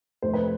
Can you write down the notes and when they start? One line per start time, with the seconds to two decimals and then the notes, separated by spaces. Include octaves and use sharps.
0.22 F1 C5
0.34 B4